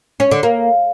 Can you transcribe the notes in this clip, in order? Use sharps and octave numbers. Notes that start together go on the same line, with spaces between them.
C#4
D3
A#3